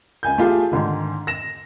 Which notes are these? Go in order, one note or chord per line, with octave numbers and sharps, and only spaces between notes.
C#2 G#5 G6
A3 F4 G4 G#4
G#2 D3 D#3
A#6 E7